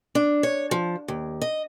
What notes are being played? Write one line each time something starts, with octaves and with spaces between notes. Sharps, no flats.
D4
C#5
F3
D#2
D#5